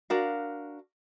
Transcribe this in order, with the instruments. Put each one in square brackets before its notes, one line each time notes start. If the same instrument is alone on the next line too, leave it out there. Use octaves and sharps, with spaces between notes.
[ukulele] D4 F#4 A#4 F5